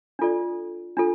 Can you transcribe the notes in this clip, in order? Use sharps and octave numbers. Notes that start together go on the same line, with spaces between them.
D4 F4 A4 D5
D4 F4 A4